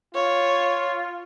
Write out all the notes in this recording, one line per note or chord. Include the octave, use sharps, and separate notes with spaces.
F4 C#5